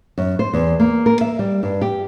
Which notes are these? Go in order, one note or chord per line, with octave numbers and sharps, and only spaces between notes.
F#2
C5
E2
A#3
A#4
E5
G3
G2
G4